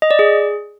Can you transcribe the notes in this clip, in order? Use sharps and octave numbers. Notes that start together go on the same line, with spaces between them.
D#5
D5
G#4